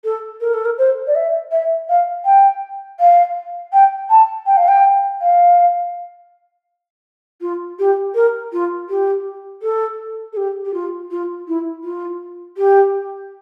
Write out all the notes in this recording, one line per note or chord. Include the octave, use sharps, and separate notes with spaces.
A4
A#4
A4
A#4
C5
D5
E5
E5
F5
G5
F5
G5
A5
G5
F5
G5
F5
F4
G4
A#4
F4
G4
A4
A4
G4
G4
F4
F4
E4
F4
G4